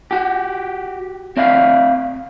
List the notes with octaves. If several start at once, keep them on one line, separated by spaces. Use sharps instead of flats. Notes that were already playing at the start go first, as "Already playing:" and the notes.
F#4 G4
C4 D5 E5 F5